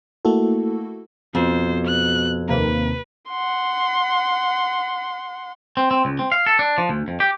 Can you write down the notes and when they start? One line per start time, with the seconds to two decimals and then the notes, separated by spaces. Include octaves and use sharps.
0.25 A3 A#3 E4 F#4 A4
1.35 F2 B2 C5
1.86 F#6
2.49 D#2 C3 A#3 B4
3.29 F#5 C6
5.77 C4
5.91 C4
6.05 C#2
6.19 C4
6.32 F5
6.46 A4
6.59 D4
6.78 F3
6.89 D2
7.08 F2
7.20 G4